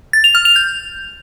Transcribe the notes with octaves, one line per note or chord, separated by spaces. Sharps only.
A6
F7
F6
F7
G6